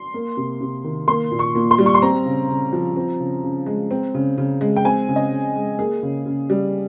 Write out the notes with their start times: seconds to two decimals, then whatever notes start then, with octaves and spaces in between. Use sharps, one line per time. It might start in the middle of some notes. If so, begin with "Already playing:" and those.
Already playing: C6
0.14 A#3
0.37 C3
0.61 C3
0.84 D#3
1.08 A#3 C6
1.32 A#2
1.39 C#6
1.55 A#2
1.71 C6
1.79 G3
1.86 C#6
1.94 C6
2.02 C4 A#5
2.26 C#3
2.49 C#3
2.73 F3
2.96 C4
3.20 C#3
3.43 C#3
3.66 G#3
3.91 C4
4.14 C#3
4.38 C#3
4.61 G#3
4.76 G5
4.85 C4 G#5
5.09 C#3
5.16 D#5
5.31 C#3
5.56 G#3
5.79 A#3 G#4
6.03 C#3
6.26 C#3
6.50 G3